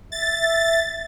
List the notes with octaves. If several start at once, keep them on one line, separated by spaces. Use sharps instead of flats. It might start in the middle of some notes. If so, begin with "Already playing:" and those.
E5 A6